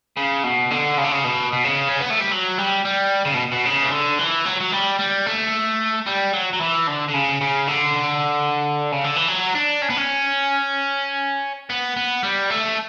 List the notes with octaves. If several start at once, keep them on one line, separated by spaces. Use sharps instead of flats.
C#3
B2
D3
C#3
D3
C#3
B2
B2
C#3
C#4
B3
A3
G3
F#3
G3
G3
C#3
B2
B2
C#3
E3
D3
E3
F#3
F#3
G3
G3
A3
G3
F#3
F#3
E3
D3
D3
C#3
C#3
D3
C#3
D3
E3
F#3
D4
C#4
B3
C#4
B3
B3
G3
A3